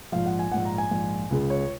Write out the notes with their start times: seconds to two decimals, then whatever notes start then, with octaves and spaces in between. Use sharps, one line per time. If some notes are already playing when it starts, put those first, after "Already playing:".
0.12 A#1 G#2 F3 F5
0.26 F#5
0.39 G#5
0.52 A#1 G#2 F3 F#5
0.65 A#5
0.78 G#5
0.91 A#1 G#2 F3
1.31 C#2 C#3 G#3
1.50 C#5